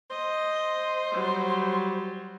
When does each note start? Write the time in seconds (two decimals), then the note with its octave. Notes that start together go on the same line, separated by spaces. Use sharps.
0.11 C5 D#5
1.13 F#3 G3